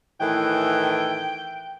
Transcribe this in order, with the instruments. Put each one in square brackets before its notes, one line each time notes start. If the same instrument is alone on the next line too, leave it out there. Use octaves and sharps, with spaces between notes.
[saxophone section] A2 D#3 E3 [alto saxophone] G5